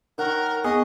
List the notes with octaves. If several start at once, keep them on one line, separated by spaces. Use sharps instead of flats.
D#3 A#4 C#5 F#5
B3 G#4 D#5 C#6